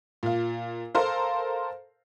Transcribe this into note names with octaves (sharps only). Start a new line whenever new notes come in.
A#2 F4
A4 A#4 C5 F5